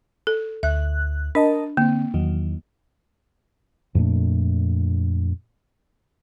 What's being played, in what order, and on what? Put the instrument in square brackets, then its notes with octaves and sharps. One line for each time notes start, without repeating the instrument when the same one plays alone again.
[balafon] A4
[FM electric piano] D2 F#6 [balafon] E5
[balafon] D4 [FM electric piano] A#4 D#5 A5
[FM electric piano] D3 C4 [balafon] A#3
[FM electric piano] E2 D#3 F#3
[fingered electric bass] F2 A#2 A3 D4